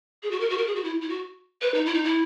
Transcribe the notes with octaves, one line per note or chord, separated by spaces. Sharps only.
G#4
F#4
A#4
F#4
A#4
G#4
F#4
E4
E4
F#4
B4
D#4
E4
D#4
E4